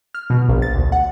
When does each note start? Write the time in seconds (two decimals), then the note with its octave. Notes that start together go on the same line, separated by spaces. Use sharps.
0.14 F6
0.30 B2
0.49 A#1
0.62 A6
0.75 D2
0.92 F#5